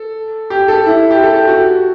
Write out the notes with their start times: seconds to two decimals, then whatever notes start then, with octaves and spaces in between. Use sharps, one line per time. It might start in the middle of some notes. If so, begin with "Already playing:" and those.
Already playing: A4
0.50 G4
0.68 A4
0.86 E4
1.11 G4
1.23 A4
1.35 G4
1.48 F#4